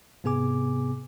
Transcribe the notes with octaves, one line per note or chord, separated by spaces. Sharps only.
G#2 C3 B3 G#4 G#5 D6